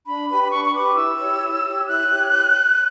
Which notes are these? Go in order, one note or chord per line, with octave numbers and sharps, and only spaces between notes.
D4 B5
G4 B4 B5
B5
D4 C#6
C#6
G4 B4 D6
E4 E6
G4 C#5
E4
G4 C#5
E4 F#6
G4 C#5